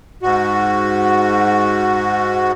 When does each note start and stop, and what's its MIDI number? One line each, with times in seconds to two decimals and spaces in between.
0.23 2.52 44
0.23 2.52 66